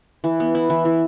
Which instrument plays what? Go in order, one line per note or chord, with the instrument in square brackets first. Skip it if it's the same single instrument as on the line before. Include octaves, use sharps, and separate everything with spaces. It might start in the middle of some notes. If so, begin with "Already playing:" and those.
[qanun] E3
B3
E4
E3
E3